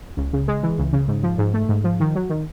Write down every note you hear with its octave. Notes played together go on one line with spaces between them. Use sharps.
C#2
C#3
G#3
E3
C#2
C#3
G#2
F3
G#2
A3
G#2
F3
D#3
F#3
D#3